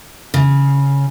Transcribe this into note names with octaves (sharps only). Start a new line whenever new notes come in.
C#3